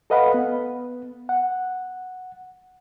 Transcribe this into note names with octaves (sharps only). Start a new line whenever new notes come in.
A4 B4 D#5 F5 F#5 B5
B3
F#5